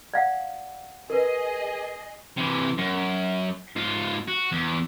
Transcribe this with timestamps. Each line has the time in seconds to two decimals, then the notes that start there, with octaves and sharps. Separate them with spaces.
0.14 D5 F5 F#5
1.10 G#4 A#4 B4 D#5
2.37 C3 E3
2.78 F#2
3.76 G#2 F4
4.28 F#4
4.52 E2